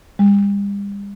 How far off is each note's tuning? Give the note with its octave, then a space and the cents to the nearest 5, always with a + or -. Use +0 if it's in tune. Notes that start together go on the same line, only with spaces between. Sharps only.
G3 +40